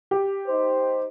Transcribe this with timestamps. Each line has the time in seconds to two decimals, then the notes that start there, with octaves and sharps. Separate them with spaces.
0.11 G4
0.48 D#4 C5